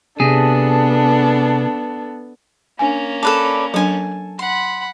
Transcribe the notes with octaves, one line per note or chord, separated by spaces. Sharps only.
C3 B3 D4 G#4 A4
A#3 C#4 D4 G#5
A4 B4 D5 A5
F#3 D4 A4 G#5 A5
F#5 B5 C6